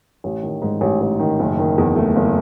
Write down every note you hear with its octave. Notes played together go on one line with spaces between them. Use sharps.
A1
D#3
G#2
A1
A1
D#3
F#1
D#3
E2
A3
F#1